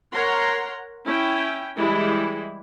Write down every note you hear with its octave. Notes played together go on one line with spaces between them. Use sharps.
A#4 C#5 F#5 A#5 C6
C#4 E4 G5
E3 G3 G#3 E4